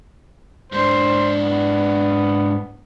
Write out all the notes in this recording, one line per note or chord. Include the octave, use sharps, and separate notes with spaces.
G#2 D4 C5
B3